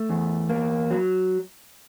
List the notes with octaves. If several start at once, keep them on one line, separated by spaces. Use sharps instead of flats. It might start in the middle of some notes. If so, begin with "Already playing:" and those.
Already playing: A3
E2
A#3
F#3